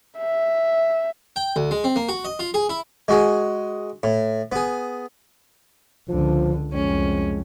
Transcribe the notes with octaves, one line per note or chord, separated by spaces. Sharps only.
E5
G5
D2
G#3
C4
A#3
F#4
D#5
F4
G#4
E4
G#3 F#4 G#4
A2
B3 G#4
C#2 D3 F3
C2 F2 G#3 C#4